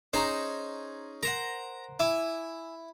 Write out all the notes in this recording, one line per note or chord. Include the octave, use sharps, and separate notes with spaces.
C#4 D#4 G#4 C5 A#5 C#6
A#4 C5 F#5 A#5
E4 E5 G#5 D6